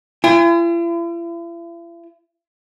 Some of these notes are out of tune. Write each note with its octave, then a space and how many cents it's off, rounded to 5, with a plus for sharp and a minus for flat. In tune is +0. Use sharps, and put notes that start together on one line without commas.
E4 +45 G#5 -45